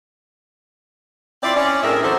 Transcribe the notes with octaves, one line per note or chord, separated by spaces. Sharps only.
C4 E4 F4 D5
C#4 D5
A2 C4 D4 G#4 A#4 E5
E3 F#3 C4 A4 C5